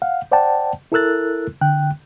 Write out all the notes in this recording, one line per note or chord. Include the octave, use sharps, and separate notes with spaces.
F5 F#5
C5 D5 F#5 G5 A5
E4 A4 A#4 E6 F#6 A6
D3 G5 F#6